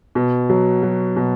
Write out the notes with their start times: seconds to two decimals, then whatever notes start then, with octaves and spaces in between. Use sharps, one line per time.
0.15 B2
0.49 F#3
0.83 F#3
1.16 B2